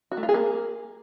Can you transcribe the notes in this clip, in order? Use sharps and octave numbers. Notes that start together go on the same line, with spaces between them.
F#4
A3
F4
G#4
A#3